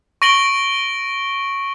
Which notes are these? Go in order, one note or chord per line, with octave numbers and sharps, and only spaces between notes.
C#6 A#6 D7 F#7 G7